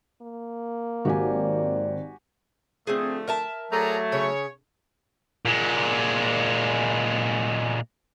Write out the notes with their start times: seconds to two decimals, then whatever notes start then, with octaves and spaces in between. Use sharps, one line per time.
0.22 A#3
1.05 G#1 F#3 C4 F#4 G4 D5 G#5
2.87 D3 F3 A3 C4 G#4
3.28 A#4 E5 A5
3.72 F#3 A3 G#4 D5 A#5
4.12 C#3 C#5
5.46 A#2 G#3